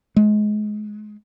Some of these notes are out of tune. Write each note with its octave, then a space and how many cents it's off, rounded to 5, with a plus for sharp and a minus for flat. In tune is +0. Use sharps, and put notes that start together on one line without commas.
G#3 +25